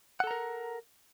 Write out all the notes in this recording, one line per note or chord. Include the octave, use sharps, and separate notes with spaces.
A4 A#4 F#5 A#5